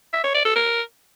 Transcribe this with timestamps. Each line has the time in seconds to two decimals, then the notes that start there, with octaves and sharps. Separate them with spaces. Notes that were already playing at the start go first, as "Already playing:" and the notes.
0.13 E5
0.24 C#5
0.34 D5
0.45 A4
0.56 A#4